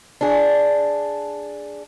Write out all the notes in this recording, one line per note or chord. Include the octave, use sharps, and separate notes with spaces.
D4 G#4